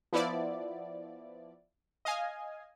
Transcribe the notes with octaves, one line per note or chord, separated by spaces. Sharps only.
F3 B3 E4 D5
D#5 F5 G#5